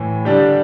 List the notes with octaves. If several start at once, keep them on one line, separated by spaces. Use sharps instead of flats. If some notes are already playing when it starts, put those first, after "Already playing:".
Already playing: A2 E3
D3 G3 D4 G4